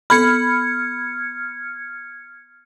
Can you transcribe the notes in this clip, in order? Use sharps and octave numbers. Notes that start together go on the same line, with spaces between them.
B3 A4 B5 F6 G#6 C#7